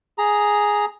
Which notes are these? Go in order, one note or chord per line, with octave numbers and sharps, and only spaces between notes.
G#4 A#5